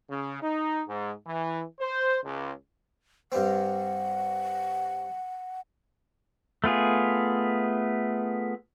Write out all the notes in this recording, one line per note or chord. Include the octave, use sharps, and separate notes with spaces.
C#3
D#4
G#2
E3
C5
C#2
G2 C4 F#5
A3 B3 F4 G#4